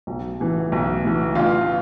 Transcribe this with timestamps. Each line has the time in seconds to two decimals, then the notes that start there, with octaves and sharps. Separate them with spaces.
0.07 B1
0.40 A2 E3
0.72 B1
1.04 A2 E3
1.35 A1 F4